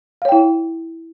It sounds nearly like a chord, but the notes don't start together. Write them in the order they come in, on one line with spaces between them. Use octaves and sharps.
F5 C#5 G5 E4